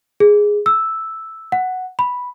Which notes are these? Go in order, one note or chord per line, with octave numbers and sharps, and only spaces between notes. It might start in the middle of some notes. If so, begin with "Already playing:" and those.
G#4
E6
F#5
B5